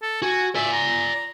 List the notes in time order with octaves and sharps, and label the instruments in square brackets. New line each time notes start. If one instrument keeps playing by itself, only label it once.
[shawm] A4
[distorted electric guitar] F#4 [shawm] G#5
[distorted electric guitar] D5 G#5 [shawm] E5
[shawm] A#5